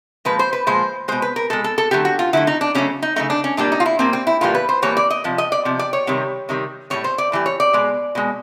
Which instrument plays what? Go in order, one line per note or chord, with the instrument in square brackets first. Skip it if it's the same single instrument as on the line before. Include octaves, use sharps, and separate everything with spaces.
[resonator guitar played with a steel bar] A#2 F3 G#3 B4
C5
B4
A#2 F3 G#3 C5
B2 G#3 C5
B4
A#4
B2 G#3 A4
A4
A4
D3 F#3 A3 G4
F#4
F4
D3 F#3 A3 E4
D#4
D4
C#3 F#3 A3 C#4
D#4
C#3 F#3 A3 D#4
D4
C#4
A#2 G3 A#3 D4
D#4
F4
E4
A#2 G3 A#3 C4
C4
E4
A2 E3 G3 A#3 F4
B4
C5
A2 E3 G3 A#3 C#5
D5
D#5
C3 F3
D#5
D5
C3 F3
D5
C#5
C3 D#3 G3
C3 D#3 G3
A2 E3 G3 C#5
C5
D5
A2 E3 G3
C#5
D5
B2 G#3
B2 G#3